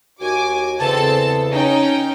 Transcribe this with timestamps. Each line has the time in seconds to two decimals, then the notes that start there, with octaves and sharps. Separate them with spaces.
0.21 D#2 F#4 G#5 D6
0.80 E2 C#3 C4 A4 A5
1.52 C#4 D#4 G5